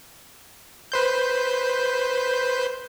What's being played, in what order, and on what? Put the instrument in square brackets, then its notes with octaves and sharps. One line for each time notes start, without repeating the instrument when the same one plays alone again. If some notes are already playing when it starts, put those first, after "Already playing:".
[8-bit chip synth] B4 C5 G6